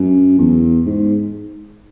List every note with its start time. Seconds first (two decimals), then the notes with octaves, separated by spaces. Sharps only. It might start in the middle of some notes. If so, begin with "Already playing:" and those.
Already playing: F#2
0.38 E2
0.86 G#2